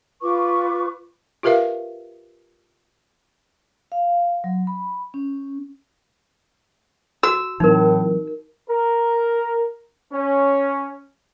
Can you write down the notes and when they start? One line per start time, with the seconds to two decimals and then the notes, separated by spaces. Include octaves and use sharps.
0.22 F4 B4 C#6 D6
1.43 F4 G4 A#4 B4 E5 F5
3.92 F5
4.44 F#3
4.67 B5
5.14 C#4
7.23 F#4 E6
7.60 A2 E3 F#3 C4 D#4 A#4
8.70 A#4
10.12 C#4